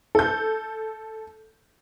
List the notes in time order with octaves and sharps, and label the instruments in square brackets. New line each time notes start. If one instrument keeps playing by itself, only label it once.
[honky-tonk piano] A4 G6